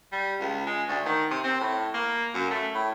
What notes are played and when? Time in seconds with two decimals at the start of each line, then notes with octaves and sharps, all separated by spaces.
0.12 G3
0.40 C#2
0.67 G#3
0.89 D2
1.06 D#3
1.31 C3
1.44 C4
1.61 A2
1.94 A#3
2.34 F#2
2.51 A3
2.75 A2